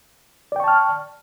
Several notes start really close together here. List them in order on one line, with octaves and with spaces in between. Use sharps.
D5 G5 C#6 A5 F6